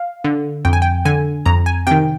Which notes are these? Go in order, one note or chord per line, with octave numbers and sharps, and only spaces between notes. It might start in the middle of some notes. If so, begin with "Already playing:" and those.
Already playing: F5
D3
F2 G5
G#5
G5
D3 G#5
F2 A#5
G#5
C3 D#3 G5